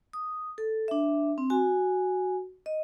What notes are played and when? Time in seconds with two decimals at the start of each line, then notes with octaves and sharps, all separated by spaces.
0.13 D#6
0.58 A4
0.88 D4 E5
1.38 C4
1.50 F#4 G#5
2.66 D#5